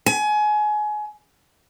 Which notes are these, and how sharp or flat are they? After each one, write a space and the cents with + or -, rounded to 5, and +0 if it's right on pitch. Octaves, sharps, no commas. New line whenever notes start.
G#5 +25